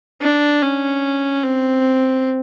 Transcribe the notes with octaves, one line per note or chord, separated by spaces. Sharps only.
D4
C#4
C4